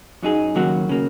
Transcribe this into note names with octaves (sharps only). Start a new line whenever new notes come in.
F#2 F#3 D#4 G#4
D#2 C#3 F#3 A#3 F#4
C#3 A#3